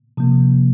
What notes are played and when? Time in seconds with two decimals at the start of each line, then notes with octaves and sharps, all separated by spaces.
0.17 C3 F3 A#3